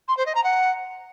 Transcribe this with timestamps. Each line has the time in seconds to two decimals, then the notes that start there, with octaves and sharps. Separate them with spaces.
0.08 C6
0.17 C5
0.26 D#5
0.35 A#5
0.44 F#5